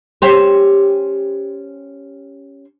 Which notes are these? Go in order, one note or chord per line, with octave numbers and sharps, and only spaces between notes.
C#4 G4 C5